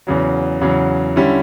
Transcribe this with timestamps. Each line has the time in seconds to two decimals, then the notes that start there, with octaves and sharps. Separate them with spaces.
0.07 E2 C#3 F#3
0.61 E2 C#3 F#3
1.16 D3 G3 C#4 E4